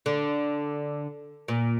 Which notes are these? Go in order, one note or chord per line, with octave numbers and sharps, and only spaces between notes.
D3
A#2